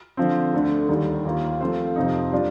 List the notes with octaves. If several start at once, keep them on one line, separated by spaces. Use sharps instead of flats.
D3 F3 C4
D2 D3 A3
D#2 D#3 G3
D#2 D#3 A#3 F4
F3 A3 C4 F4 C5
F2 C3 F3 C4 D#4
G3 D4 F4